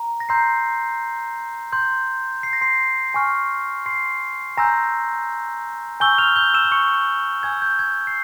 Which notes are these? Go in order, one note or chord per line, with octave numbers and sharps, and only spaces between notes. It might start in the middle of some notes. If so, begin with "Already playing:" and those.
Already playing: A#5
A#6
A#5 C6 E6 G6 C7
C6 G6
C7
A#6
C6 C7
G#5 C#6 F6
C6 C7
G#5 A#5 C6 E6 G6 A#6
G#5 C#6 E6 G6 G7
F6 F7
G6 G7
E6 E7
E7
C#6 C#7
G#5 E6 G6 G#6
G6
G#6
C7